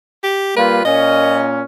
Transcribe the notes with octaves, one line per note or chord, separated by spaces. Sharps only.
G4
G3 A#3 F4 B4
A#2 C#4 D#5